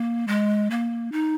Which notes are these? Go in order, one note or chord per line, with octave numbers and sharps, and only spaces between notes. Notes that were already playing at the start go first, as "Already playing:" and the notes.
Already playing: A#3
G#3
A#3
D#4